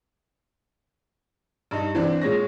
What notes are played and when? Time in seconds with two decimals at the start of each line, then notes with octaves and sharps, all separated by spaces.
1.71 G2 D#4
1.95 E3 C4 D4
2.22 A#2 G#3 C#5 A#6